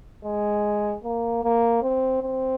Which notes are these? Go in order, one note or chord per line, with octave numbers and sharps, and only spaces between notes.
G#3
A#3
A#3
C4
C4